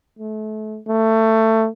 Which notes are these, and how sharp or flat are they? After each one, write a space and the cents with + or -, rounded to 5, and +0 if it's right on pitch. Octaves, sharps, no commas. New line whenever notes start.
A3 -30
A3 +20